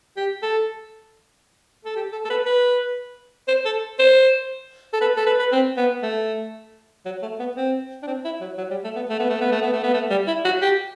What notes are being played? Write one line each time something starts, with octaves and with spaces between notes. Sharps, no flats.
G4
A4
A4
G4
A4
A4
B4
B4
C5
A4
C5
A4
B4
A4
B4
B4
C4
B3
A3
F#3
A3
B3
C4
D4
C4
E4
F#3
F#3
G3
A3
B3
A3
B3
A3
B3
A3
B3
A3
B3
A3
G3
E4
F#4
G4